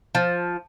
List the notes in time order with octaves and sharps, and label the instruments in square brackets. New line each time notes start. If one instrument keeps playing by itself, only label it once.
[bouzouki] F3